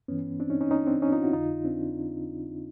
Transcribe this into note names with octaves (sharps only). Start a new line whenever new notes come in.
G2 E3 B3 C#4
C4 D4
C#4 D#4
C#4 D#4
C#4 D#4
C4 D4
C#4 D#4
D#4 F4
E4 F#4
F2 D3 D#4 F4
C4 D4